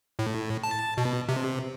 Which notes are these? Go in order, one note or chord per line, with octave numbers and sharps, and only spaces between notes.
A2
A5
B2
C3